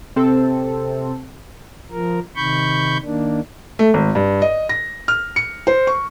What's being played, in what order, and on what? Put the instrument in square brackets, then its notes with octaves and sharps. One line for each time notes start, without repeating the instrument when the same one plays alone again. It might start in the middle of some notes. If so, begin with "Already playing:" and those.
[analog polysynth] C3 C4 A4
[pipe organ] F3 A#4
C3 D#3 B5 C#6 G6
D#3 A#3 D4
[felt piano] A3
G#1
G2
D#5
A#6
F6
C#7
C5
C#6